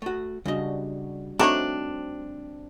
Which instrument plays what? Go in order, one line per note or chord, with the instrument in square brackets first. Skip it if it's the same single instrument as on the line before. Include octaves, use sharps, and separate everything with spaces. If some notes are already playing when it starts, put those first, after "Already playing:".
[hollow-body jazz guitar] A3 F#4
[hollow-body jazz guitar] C#3 D#5 [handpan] G3 D4 F#4
[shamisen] A3 D#4 C#5 [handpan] C4 [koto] D4 [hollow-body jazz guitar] F#4